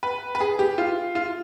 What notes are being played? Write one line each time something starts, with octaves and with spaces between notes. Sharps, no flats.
B4
B4
G#4
G4
F4
F4